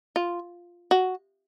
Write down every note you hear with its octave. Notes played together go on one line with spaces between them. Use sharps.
F4
F#4